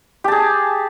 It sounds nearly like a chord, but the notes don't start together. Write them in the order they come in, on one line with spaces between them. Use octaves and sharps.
G4 A5 G#4